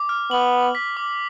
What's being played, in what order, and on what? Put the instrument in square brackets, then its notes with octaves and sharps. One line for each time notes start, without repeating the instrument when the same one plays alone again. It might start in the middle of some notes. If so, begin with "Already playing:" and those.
Already playing: [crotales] D6
F6
[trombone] B3 [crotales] F#7
[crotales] F#7
B6
D6